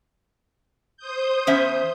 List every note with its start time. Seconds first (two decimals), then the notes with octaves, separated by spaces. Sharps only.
0.97 C5 D#6 G6
1.47 E2 C#4 E5